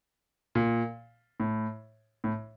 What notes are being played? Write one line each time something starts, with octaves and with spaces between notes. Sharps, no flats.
A#2
A2
A2